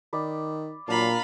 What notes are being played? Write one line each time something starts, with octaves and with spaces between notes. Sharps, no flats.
D#3 D5 B5
A#2 F#3 D4 F4 F5 A#5 B5